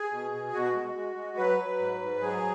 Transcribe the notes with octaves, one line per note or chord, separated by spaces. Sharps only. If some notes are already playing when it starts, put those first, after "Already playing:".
Already playing: G#4
B2
B2
B2 F#4
G#3
G#3
G#3
F#3 B4
F#3
G#2
G#2
F#3 G#4